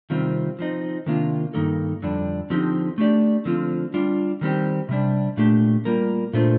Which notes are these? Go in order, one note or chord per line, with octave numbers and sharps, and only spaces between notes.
C3 D#3 G3 C4 F4
F3 C4 D#4
C3 D#3 A#3 D4 F4
G2 D#3 A#3 D#4 A4
F2 D3 G3 D4
D3 F3 C4 D#4 G4
A3 D4 G4 D5
D3 F3 C4 F4
G3 D4 F4
D#3 G3 C4 G4
C3 G3 D4
A#2 A3 D4 G4
G3 A#3 F4 A#4
A#2 A3 D4 F4 C5